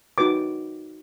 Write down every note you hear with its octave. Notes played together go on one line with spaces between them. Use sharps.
D#4 F#4 B4 D6